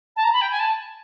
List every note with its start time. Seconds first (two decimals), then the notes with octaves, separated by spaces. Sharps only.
0.16 A5
0.23 A#5
0.33 B5
0.41 G5
0.51 G#5
0.59 A5